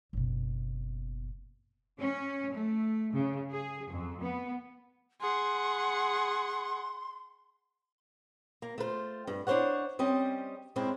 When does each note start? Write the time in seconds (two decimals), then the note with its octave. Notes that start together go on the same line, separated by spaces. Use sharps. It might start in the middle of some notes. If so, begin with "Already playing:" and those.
0.13 F#1 B2
1.97 C#4
2.52 A3
3.14 C#3
3.50 G#4
3.89 F2
4.21 B3
5.21 G#4 F#5 C6
8.62 A#3
8.78 A3 F4 B4 C5
9.27 G2
9.47 D4 E4 C5 C#5 F#5
9.99 G3 C4 C#4 D#5
10.76 G#2 G#3 C4 C#4 E4